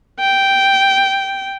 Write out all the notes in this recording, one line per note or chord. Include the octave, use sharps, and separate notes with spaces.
G5